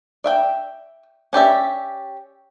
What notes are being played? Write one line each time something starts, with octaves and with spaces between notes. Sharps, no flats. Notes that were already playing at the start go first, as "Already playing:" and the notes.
D5 E5 G5
C#4 G4 D5 E5